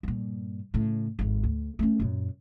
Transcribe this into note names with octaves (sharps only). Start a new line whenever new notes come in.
G2 A#2
A2 C#3
G#1 F2
D2
A3 C#4
F#2 A#2